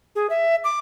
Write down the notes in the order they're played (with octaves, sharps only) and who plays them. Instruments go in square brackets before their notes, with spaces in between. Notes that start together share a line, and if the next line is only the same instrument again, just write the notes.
[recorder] G#4
E5
D6